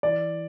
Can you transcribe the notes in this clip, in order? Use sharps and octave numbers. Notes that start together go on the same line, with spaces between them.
E3 D5